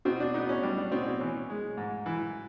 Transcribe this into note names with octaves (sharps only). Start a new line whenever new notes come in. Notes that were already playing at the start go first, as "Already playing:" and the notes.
B2 C4
D4
B3 D#4
C#4
G3 D4
D4
B2 C4
C#4
E3 C#4
G#3
G#2
E3